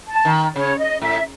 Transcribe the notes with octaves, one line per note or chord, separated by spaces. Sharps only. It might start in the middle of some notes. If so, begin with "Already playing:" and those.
A5
D#3
C#3 C#5
D#5
A2 E5